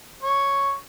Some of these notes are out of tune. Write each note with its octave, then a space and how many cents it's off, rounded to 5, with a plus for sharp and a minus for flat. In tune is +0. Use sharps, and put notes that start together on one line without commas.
C#5 +0